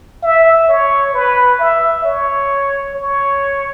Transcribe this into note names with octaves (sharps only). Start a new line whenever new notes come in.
E5
C#5
B4
E5
C#5
C#5